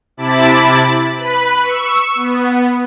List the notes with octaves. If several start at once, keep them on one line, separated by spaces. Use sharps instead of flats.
C3 E4 A5 B5 D6 A6
B4 B5
C#6 E6
B3